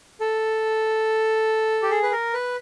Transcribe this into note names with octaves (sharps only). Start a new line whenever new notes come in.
A4
G4
G#4
B4
A#4
B4